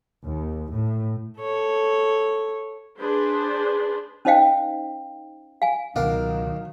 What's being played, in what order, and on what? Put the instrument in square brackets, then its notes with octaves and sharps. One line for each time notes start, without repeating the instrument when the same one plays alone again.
[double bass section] D#2
A2
[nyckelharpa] A4 C#5
[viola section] D4 G#4 B4 C5
[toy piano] C#4 D#4 C5 D#5 F5 G5
F5 G#5
[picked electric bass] C#2 B2 [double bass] D#3 F#3 [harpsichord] D4 A#4 [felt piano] F5